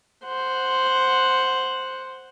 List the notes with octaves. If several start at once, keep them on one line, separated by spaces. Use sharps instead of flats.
C5 F#5